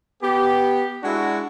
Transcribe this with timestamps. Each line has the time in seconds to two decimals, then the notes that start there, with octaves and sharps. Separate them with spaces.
0.22 B3 G4
1.04 G#3 D4 E4 F#4